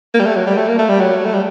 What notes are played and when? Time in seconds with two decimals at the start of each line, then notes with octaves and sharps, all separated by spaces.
0.14 A#3
0.19 G3
0.25 A3
0.36 F#3
0.47 G3
0.57 A3
0.68 A#3
0.79 A3
0.89 G3
1.00 F#3
1.25 A3
1.34 G3